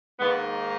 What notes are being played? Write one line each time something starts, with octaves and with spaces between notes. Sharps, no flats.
G#2 D#3 A#3 B3